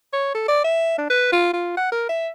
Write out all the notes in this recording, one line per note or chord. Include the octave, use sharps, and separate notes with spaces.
C#5
A4
D5
E5
D4
B4
F4
F4
F#5
A#4
E5